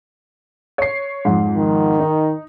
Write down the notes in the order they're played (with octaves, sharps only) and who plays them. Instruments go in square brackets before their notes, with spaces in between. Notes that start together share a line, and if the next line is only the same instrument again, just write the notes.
[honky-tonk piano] C#5 C7
F2 G#2
[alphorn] D#3
[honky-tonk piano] D#4